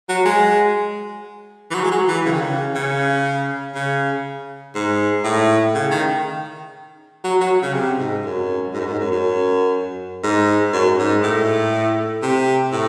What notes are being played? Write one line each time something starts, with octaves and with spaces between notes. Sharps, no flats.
F#3
G#3
E3
F#3
G#3
F#3
E3
C#3
D#3
C#3
C#3
C#3
G#2
A2
C#3
D#3
F#3
F#3
C#3
C3
G#2
F#2
G#2
F#2
G#2
F#2
F#2
G#2
F#2
G#2
A2
C3
A2